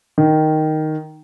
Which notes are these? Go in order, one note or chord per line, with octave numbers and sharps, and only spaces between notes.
D#3